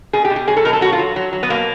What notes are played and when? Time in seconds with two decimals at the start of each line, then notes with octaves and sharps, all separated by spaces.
0.13 B2 G#4
0.25 G4
0.30 B2
0.36 G4
0.47 F#3 G#4
0.57 A4
0.65 B2 A#4
0.73 A4
0.81 F#3 F#4
0.92 F4
0.99 F#3
1.16 F#3
1.33 F#3
1.43 B3
1.50 B2 A#3